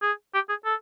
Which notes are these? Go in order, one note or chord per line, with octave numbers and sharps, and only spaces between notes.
G#4
G4
G#4
A4